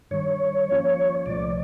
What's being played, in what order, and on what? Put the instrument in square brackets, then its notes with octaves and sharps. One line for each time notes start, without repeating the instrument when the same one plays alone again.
[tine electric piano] G2 D#3 G3 [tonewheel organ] C#5
[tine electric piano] F3 A#3 C#4 F4
[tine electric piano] C2 A#2 F3 A3 [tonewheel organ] D5